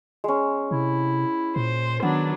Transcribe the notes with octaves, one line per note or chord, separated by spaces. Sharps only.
G#3 C#4
C3 E4
A#2 C5
D#3 F#3 B3 D4